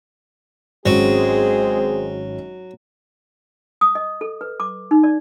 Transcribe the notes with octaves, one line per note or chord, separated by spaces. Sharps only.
G#1 F#3 G#3 C4 C#4 G#4
D#6
D#5
A4
B4
D6
D#4
D5